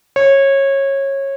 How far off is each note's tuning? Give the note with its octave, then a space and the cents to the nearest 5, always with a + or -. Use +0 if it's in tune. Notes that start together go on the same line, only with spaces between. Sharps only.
C#5 -20